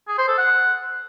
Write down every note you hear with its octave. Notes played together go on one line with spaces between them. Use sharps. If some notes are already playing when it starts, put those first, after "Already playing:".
G#4
C5
A4
F#5